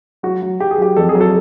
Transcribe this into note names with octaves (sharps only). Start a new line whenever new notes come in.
F#3 F#4
F#3
F#3 G4
G#4
F#3 G4
F2 A4
G#4
F#3
A4